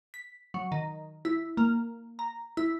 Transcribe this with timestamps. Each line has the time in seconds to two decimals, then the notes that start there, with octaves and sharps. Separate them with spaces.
0.14 B6
0.54 F#3
0.72 D#3
1.25 E4
1.57 A#3
2.19 A#5
2.57 E4